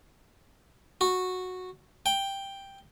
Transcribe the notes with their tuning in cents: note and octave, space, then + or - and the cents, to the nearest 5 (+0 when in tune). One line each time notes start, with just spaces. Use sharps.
F#4 -10
G5 +5